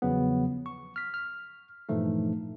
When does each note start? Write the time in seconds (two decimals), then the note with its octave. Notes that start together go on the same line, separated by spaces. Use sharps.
0.02 E2 C#3 F3 F#3 B3
0.66 C#6
0.96 F6 B6
1.14 F6
1.89 G2 A#2 E3 F3 A3 D#4